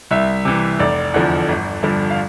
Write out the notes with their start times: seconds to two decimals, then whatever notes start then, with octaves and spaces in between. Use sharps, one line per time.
0.11 C2 E5
0.45 C3 E3
0.80 F1 D5
1.14 E2 D3 F3
1.48 G1
1.83 G2 D3 F3
2.10 F5